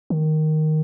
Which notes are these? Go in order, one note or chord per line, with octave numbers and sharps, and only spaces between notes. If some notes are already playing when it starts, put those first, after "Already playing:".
D#3